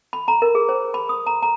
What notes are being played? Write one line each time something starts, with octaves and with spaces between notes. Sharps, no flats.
B5
A#5
A#4
G#4
C5
B5
D#6
A#5
A#5